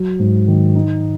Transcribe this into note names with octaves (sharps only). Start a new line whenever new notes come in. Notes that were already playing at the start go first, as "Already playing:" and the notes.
Already playing: F#3
G#2
D#3
D#4